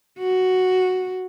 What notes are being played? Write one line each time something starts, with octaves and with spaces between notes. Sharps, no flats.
F#4